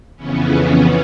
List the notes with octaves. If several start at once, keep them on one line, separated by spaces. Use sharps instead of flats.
F2 C#3 E3 B3 C#4